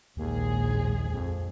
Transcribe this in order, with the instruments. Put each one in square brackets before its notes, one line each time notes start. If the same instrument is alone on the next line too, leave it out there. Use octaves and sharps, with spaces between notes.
[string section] A#1 G#2 G#4 [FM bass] D#2
[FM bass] F2